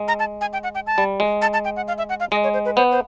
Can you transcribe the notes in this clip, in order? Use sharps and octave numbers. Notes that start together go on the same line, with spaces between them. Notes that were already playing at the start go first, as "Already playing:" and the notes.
Already playing: G#3
A#5
A5
G#5
G5
F#5
G5
A5
G3
G#3
A5
A5
G5
F#5
F5
E5
F#5
F5
G#3 D#5
C#5
C5
B4
B3 C5
C5